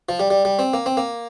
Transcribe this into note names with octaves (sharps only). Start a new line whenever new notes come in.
F3
G3
G3
G3
C4
A#3
C4
A#3